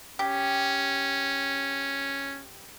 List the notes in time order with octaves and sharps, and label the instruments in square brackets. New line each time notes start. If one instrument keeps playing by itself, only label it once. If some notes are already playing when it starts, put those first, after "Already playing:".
[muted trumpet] C#4 [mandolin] G4